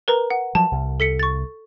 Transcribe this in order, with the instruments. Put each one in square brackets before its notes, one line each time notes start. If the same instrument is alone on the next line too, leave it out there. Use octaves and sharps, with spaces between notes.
[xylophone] A#4 B4 A#5
F#5
[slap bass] F3 F#3 [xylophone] A5
[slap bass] C2
[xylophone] A4 B6 C#7
C#6 A6